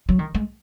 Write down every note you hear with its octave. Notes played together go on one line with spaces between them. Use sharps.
F#3
D#3
G#3